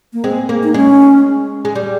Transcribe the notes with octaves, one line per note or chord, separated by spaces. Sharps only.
A#3
G#3 C4
A#3
D#4
G#3 C#4
G#3
G3